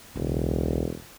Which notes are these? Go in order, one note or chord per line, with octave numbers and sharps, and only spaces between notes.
E1 C#2